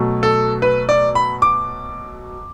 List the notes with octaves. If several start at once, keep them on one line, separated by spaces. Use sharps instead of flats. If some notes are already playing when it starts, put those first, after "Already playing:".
Already playing: B2 F#3 A3
A4
B4
D5
B5
D6